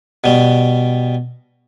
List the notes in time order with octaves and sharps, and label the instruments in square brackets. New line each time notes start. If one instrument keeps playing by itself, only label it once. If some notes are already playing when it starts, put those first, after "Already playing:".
[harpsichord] B2 G3